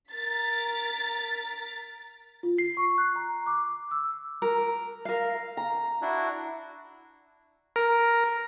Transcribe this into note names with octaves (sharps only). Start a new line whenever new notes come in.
A#4 A6 B6
F4
C7
C#6
F#6
A#5
D6
E6
A#4
A#4 F5
A#5
D4 E4 F#4
A#4